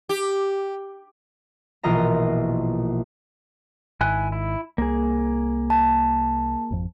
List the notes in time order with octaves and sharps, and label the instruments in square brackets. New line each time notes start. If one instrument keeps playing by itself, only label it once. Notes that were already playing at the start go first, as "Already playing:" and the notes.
[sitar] G4
[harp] A#1 B2 E3 F4 D#5 A#5
[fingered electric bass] G#1 G#2 D#3 [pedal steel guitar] E4 G#5 F#6
[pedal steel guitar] E4
[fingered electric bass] C2 [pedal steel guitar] A#3 G#4
[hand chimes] A5
[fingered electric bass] G#1 F2 F3